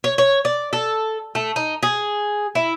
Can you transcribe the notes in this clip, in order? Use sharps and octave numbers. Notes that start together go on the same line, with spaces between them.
C#5
C#5
D5
A4
A3
D#4
G#4
E4